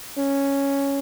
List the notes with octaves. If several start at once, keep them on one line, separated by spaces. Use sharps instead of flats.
C#4